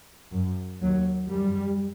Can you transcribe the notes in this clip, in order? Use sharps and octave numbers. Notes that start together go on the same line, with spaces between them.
F#2
D#2 F#3
F#2 G3